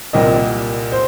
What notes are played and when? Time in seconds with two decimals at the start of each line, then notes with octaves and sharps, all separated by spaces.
0.13 C2 A#2 G3 A#3 D#5
0.92 C5